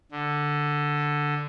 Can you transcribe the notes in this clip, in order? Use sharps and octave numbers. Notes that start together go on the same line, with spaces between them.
D3